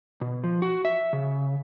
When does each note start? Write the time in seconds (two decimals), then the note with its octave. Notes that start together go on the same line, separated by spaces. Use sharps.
0.21 B2
0.44 F3
0.62 F#4
0.85 E5
1.13 C#3